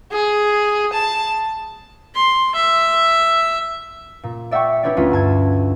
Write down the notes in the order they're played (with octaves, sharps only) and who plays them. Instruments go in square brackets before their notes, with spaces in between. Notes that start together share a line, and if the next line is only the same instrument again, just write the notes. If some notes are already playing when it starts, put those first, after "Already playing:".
[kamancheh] G#4
A5
[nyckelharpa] C6
E5
[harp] A#2
D5 E5 F#5 G5 C#6
D4 E4 G4 B4 C#5 D5
D2 C#4 E4 F4 B4
G2 A5 G#6